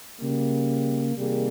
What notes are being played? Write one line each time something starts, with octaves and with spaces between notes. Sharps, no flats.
C#3 G3 A#3
C3 D#3 G3 A#3 G#4